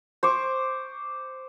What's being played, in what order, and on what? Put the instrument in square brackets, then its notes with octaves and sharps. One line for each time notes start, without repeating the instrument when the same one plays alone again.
[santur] C5 C#6 D6